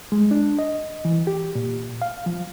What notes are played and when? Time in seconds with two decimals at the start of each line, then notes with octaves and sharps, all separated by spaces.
0.12 G#3
0.31 D4
0.59 D#5
1.05 E3
1.27 G4
1.55 A#2
2.02 F5
2.26 F3